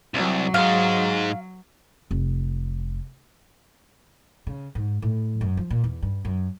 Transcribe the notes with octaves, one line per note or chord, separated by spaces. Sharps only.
C2 F#3
G#2 G#3 F5
F1
C#3
G#2
A2
F#2
F3
A#2
E2
G2
F#2